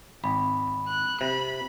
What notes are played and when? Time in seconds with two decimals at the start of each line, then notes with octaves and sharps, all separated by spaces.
0.24 G#1 B5
0.88 F#6
1.21 C3 B5